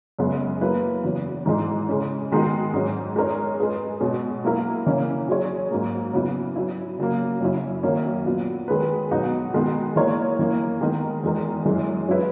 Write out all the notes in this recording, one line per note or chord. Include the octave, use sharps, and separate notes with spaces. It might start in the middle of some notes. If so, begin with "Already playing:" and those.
F#2 C#3 G#3 B3
F#3 A#3 E4 B4
E2 C#3 F#3
G#2 E3 G#3 D#4
C#3 G#3 C#4
D#3 G#3 B3 D#4 F#4
G#2 F#3 C#4
G#3 D#4 A#4 C#5
G#3 C#4 G#4 B4
B2 G#3 C#4
F#3 A#3 E4 A#4
C#3 E3 A#3 C#4
F#3 C#4 G#4 C#5
G#2 F#3 A#3
C#3 F#3 B3 E4
F#3 C#4 E4
C#3 F#3 A#3
F#2 C#3 F#3 C#4 E4
F#2 D#3 F#3 A#3 C#4
A#2 F#3 B3 F#4
D#3 G#3 C#4 G#4 B4
B2 F#3 B3 D#4 F#4
D#3 G#3 B3 D#4
E3 A#3 D#4 A#4 C#5
F#2 E3 A#3 C#4
D#3 G#3 B3 D#4 A#4
E2 D#3 G#3 D#4 A#4
F#2 E3 G#3
F#3 C#4 E4 B4